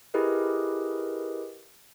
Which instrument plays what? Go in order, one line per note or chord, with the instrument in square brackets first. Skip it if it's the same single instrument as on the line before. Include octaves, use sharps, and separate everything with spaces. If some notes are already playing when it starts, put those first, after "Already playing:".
[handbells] E4 G4 G#4 A#4 B4 D#5